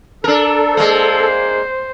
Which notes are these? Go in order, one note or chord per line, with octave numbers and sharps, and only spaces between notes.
D4 A4 A#4
G#3 A#3 C5